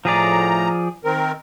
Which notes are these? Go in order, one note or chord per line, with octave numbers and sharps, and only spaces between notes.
A2 F3 G#4 D5 A#5
D#3 C4 A#4